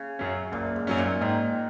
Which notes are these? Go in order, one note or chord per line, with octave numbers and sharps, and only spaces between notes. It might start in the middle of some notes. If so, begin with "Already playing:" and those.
Already playing: C#3
F#2 F#3 C#4
F#1 A#2
G#2
F#2 F#3 C#4
A#2
G#2 D#3